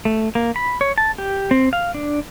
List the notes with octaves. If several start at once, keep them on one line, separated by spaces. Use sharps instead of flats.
A3
A#3
B5
C#5
A5
G4
C4
F5
D4